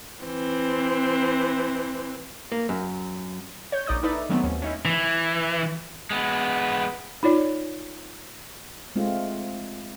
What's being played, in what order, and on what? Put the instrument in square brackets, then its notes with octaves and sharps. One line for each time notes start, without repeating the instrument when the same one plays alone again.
[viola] E3 C4
[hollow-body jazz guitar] A#3
F#2
[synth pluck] C#5 G6
A#1 D#4 D5 D#6 G6
D#4 E4 A4 B4 D5 E5
D#3 F#3 A3 B3 C4
D#2 C#4
C#4 D#4 E4
[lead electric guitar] E3
[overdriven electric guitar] G#3 B3
[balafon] D#4 F4 C#5 D5
[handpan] G#3 A3 C4 F4